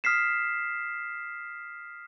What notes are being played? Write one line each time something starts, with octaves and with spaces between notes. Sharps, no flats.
D#6 F6 B6 C7 E7